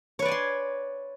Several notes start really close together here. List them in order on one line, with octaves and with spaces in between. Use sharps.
C#5 B4 D5 G#5 C6